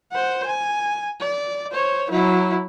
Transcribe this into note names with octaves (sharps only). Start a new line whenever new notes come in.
C5 F#5
G#5
D5
C5 C#5
F#3 E4